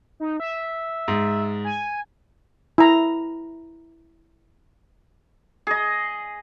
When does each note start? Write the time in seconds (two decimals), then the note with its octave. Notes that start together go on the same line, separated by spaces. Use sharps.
0.20 D#4
0.40 E5
1.08 G#2
1.64 G#5
2.78 E4 A#5
5.67 G#4 D#5